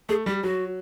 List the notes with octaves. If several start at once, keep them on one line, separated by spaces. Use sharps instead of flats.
A3 G#4
G3 G4
F#3 F#4